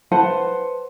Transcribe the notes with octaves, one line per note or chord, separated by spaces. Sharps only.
B4 C5 F#5 A5